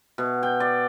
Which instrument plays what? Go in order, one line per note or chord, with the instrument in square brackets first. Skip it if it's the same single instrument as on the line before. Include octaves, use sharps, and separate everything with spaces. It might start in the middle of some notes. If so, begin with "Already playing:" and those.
[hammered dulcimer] B2
G5
D5